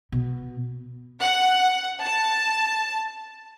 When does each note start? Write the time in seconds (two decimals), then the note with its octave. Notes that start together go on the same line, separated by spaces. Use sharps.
0.12 B2
1.22 F#5
2.02 A5